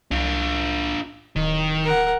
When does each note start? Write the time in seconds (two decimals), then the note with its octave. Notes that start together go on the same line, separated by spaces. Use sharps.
0.11 C2 D4 F4
1.36 D1 D#3
1.84 A#4 F#5